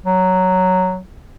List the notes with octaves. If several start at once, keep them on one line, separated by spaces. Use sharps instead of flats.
F#3